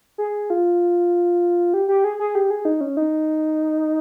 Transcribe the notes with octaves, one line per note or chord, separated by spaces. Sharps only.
G#4
F4
G4
G4
G#4
G#4
G4
G#4
D#4
C#4
D#4